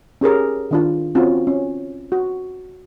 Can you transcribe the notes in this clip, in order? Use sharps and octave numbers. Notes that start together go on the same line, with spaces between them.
C#4 G4 G#4 A#4
D#3 D4 F4
C4 C#4 F4 F#4
C#4
F#4